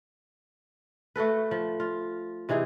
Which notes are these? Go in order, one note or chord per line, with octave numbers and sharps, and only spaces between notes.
A3 F#4 A4 B4
F3
F4
C3 E3 D#4 G#4